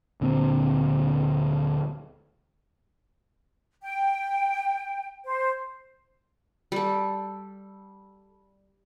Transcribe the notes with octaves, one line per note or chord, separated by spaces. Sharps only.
D2 A#2 D3 C4
G5
C5
G3 A4